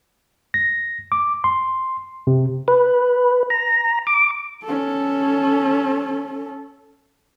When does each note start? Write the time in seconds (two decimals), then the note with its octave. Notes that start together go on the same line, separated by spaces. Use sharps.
0.54 A#6
1.12 D6
1.44 C6
2.27 C3
2.68 B4
3.50 A#5
4.07 D6
4.64 C#4 A4